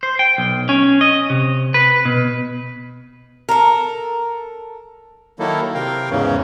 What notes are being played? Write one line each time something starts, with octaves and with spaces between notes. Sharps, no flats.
C5
G5
B1
C#4
D#5
C3
B4
B2
A4 A#4
D#3 F#3 A#3 D#4 E4 A4
C3 A#4 F5 G5
E2 G#2 C#3 E3 C#4